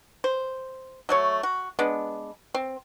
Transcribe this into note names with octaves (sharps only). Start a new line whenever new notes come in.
C5
F#3 A3 C#5
F#4
G#3 B3 D4
C4